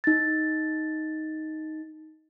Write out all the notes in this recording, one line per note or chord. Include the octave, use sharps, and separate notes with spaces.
D#4 A6